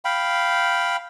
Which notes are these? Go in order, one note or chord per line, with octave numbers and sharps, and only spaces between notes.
F5 G5 B5